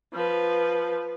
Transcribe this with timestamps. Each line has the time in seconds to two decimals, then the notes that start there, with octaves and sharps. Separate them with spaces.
0.13 F3 B4